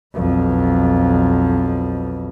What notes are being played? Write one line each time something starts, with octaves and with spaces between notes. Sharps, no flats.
B1 F2